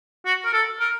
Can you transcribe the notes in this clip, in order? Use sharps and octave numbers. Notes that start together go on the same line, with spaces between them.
F#4
A#4
A4
A#4